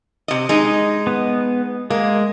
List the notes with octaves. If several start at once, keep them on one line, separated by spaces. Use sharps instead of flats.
C3 D#5
G#3 D#4
B3
G#3 A#3